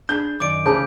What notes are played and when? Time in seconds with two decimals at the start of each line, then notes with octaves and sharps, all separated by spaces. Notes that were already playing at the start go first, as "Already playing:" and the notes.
0.09 D4 G#4 B5 G6
0.40 F#2 D#3 D5 D6 D7
0.66 C#3 E3 G3 A3 G#4 C5 A5 G6